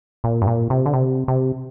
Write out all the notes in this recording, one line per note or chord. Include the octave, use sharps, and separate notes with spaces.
A#2
G2
A#2
C3
D3
C3
C3